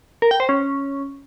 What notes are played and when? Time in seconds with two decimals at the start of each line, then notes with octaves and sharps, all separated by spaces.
0.22 A#4
0.31 G5
0.40 C5
0.49 C#4